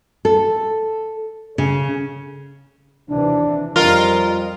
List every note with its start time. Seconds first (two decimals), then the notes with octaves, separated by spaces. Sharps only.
0.25 A4
1.58 C#3
3.08 D#2 C3 E3 D4
3.76 F2 G3 F4 A#4 D#5